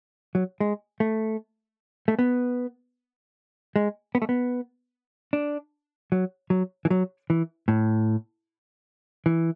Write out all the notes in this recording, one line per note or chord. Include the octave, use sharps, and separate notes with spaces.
F#3
G#3
A3
A3
B3
G#3
B3
A3
B3
D4
F#3
F#3
E3
F#3
E3
A2
E3